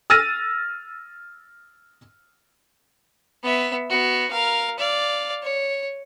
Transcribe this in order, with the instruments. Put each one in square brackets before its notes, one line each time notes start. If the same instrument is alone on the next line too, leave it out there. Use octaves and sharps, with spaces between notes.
[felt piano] E6 F6 A6 A#6 D#7
[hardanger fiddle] B3 E5
B3 F#4
A#4 F5
D5 F5
C#5